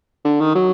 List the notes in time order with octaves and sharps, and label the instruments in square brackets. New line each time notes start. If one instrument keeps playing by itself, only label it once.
[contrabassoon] D3
D#3
F#3